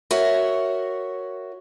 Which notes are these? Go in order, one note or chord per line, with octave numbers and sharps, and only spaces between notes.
F#4 A#4 C#5 E5